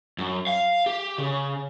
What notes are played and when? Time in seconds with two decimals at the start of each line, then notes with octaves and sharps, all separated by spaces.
0.18 F#2
0.47 F5
0.86 G4
1.18 C#3